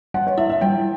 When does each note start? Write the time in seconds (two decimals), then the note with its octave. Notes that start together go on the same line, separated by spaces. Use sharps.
0.14 G3 F#5
0.27 C#5
0.38 E4 E5
0.50 E5
0.61 G3 G5